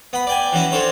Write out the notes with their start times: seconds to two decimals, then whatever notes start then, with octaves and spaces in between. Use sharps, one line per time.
0.13 B3 B5
0.27 D5 G5 G#5
0.53 E3 F#3 C#4 E4
0.72 C4 D4 A4 C5 C#5